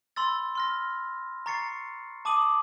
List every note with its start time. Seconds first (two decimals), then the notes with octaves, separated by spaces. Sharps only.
0.16 B5 C6 E6 A6
0.55 C6 F6 A#6
1.46 A#5 C#6 A6 C7 C#7
2.25 A5 D6 D#6 D#7 F#7